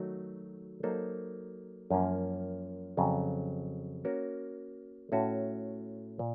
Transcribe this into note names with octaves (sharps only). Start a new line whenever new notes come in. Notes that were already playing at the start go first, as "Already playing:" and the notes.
Already playing: D#3 F#3 A3 D#4 F#4
F#3 A#3 D#4 A4 C5
F#2 F3 A#3 C#4
F2 C#3 F#3
A#3 C#4 F#4 A#4
A2 A3 C#4 F#4 A4
A#2